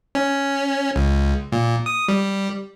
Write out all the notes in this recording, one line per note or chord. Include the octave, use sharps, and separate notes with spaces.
C#4
C#2
A#2
D#6
G3